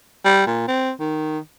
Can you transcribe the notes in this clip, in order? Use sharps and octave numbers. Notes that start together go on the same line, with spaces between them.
G3
A#2
C4
D#3